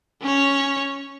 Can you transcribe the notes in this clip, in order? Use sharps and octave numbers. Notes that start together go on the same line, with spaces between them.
C#4 C#5